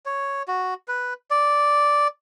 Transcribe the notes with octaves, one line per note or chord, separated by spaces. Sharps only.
C#5
F#4
B4
D5